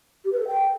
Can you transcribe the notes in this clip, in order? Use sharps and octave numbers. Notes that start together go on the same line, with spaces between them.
G4
B4
A4
G5